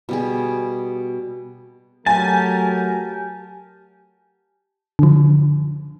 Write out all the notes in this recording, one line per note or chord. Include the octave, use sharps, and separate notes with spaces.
B2 G3 G#4
F#3 A3 G4 A#4 G#5 A5
D3 F3